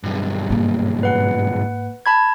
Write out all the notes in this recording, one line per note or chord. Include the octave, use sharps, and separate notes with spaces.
B1 G2
G#2 A#3
B4 F#5
A5 B5 G#6